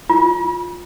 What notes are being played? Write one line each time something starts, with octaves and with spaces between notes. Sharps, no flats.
F4